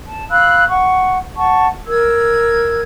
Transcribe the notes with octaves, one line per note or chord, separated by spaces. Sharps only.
A5
F5 B5 E6 F#6
F#5 C#6
F#5 A5 C#6
A#4 E6 G#6